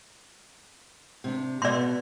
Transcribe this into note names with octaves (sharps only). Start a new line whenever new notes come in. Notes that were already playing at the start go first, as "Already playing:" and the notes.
C3 D4
B2 B3 D5 C6